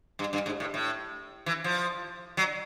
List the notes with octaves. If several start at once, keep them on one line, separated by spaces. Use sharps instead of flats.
G2
G2
G#2
A2
A2
E3
F3
F#3